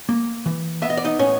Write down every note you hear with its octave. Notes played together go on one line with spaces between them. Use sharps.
A#3
E3
B3 E5
D#5
D5
D#4 D#5
A2 C#4 C#5